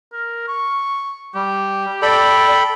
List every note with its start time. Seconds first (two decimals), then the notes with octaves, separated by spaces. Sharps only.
0.13 A#4
0.48 C#6
1.35 G3 G4
2.02 A4 D5 G5 B5